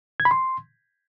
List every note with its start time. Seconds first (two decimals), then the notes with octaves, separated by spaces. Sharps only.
0.20 G#6
0.25 B5
0.31 C6